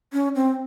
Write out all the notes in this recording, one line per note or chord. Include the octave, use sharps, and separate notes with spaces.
C#4
C4